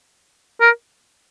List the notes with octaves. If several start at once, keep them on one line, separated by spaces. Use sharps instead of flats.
A#4